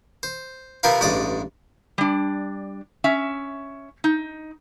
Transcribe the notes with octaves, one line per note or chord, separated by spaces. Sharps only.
C5
C3 F3 C4 A#4 B4 F5
A1 G2 G#3 D5 D6 D#6
G3 D4
C#4 E5
D#4